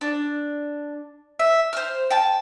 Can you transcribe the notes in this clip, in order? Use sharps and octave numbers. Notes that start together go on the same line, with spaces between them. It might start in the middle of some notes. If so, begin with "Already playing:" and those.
D4
E5
C5 F6
G5 A5